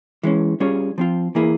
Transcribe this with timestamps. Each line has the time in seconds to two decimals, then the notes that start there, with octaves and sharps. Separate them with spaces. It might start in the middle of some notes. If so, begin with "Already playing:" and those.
0.23 E3 G#3 C#4
0.60 G3 C#4 F4 G#4 C#5
0.98 F3 C4 F4
1.35 E3 A#3 E4 G#4